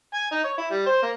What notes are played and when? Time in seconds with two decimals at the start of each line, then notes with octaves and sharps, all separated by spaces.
0.13 G#5
0.31 D#4
0.44 C#5
0.58 E4
0.71 G3
0.86 C5
1.02 A#3